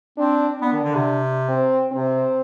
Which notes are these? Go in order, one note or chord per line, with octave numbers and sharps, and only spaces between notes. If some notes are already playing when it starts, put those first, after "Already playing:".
C4 D4
B3 D4
D#3
D3
C3
C4
C3 C4